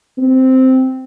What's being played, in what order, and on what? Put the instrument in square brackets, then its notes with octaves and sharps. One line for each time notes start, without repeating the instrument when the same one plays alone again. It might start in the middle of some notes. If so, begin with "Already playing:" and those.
[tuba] C4